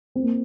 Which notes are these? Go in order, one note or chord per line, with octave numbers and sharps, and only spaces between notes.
C4
A#3